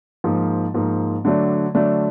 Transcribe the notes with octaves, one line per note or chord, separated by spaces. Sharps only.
G#2 F3 A#3
G#2 F3 A#3
D3 F#3 A3 D4
D3 F#3 A3 D4